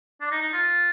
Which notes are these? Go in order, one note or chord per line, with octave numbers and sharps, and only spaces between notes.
D4
D#4
D#4
F4